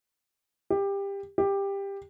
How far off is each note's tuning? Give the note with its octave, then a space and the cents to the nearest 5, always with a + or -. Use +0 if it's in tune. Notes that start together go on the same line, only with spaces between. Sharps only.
G4 +20
G4 +15